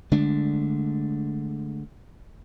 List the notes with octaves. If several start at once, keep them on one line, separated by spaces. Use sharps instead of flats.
D3 G#3 A3 D4